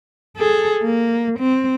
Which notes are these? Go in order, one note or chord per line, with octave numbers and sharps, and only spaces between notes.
G#4 A4
A#3
C4